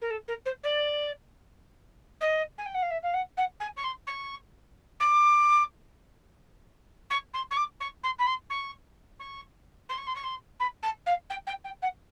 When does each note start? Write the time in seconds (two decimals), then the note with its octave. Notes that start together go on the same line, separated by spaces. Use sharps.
0.01 A#4
0.10 A4
0.27 A#4
0.45 C5
0.63 D5
2.20 D#5
2.57 G#5
2.65 G5
2.74 F#5
2.82 F5
2.90 E5
3.02 F5
3.13 F#5
3.36 F#5
3.59 G#5
3.76 C#6
3.83 C6
4.06 C#6
4.99 D6
7.10 C#6
7.33 C6
7.50 C#6
7.56 D6
7.80 C#6
8.03 C6
8.18 B5
8.26 C6
8.49 C#6
9.19 C#6
9.88 C6
9.97 C#6
10.06 C6
10.15 C#6
10.23 C6
10.59 B5
10.82 A5
11.06 F5
11.29 G5
11.46 G5
11.64 G5
11.81 F#5